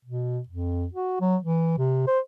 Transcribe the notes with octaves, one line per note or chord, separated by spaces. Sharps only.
B2
F2
F#4
F#3
E3
C3
C5